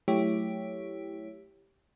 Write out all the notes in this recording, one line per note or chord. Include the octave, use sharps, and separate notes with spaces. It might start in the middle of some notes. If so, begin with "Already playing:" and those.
F#3 A3 E4 G4 C#5